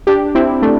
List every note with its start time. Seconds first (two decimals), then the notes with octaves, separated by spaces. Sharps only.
0.07 D4 G4
0.35 C4 E4
0.62 A3 D4